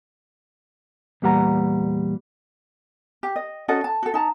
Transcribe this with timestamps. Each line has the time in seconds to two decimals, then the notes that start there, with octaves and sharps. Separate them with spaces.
1.22 E2 A#2 G3 F#5 A#5
3.23 G4
3.36 D#5
3.68 C#4 F#4 A4 D#5
3.84 A5
4.03 F#4 A4
4.14 D#4 A5 A#5